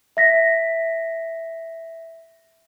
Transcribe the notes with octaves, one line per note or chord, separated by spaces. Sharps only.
E5 A#6 B6